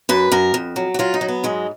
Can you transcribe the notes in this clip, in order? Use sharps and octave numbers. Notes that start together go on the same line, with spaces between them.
F#2 B4
F#2 A#4
F2
F#3
F#4
F#3 F4
D#4
F#3
B3
G#2 G#3